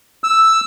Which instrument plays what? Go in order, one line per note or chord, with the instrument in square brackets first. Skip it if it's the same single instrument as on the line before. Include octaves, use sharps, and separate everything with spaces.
[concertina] E6